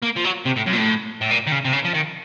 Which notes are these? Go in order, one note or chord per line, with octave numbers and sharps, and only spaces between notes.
A#3
F3
F#3
C3
A2
F#2
A#2
A2
A2
A#2
D#3
C#3
C3
C#3
F3
D#3